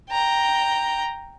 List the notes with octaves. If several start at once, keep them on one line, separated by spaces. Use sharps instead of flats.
G5 A#5